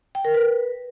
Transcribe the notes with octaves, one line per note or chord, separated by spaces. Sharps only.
G5
A#4
B4